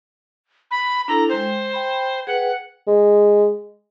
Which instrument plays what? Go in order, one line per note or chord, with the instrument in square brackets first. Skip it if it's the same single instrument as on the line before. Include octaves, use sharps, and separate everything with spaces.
[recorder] B5
[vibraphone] D4 E4 A4 [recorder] A#5
[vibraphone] G#3 G5 [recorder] C5
[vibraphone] G5 B5
[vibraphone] G#4 B4 G5 [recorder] F#5
[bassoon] G#3